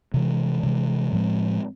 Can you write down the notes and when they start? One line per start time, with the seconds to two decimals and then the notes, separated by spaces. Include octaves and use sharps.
0.14 C3 E3 G#3
0.63 C3 E3 G#3
1.12 A2 F3 G#3 C4